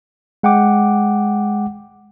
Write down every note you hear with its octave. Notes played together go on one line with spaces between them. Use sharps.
G#3 F#5 G5 D6